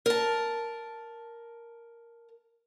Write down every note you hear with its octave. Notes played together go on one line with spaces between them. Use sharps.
A#4 A5